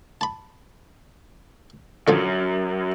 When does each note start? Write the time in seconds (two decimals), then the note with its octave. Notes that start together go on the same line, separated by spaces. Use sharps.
0.21 A5 B5
2.08 F#2 D3 F3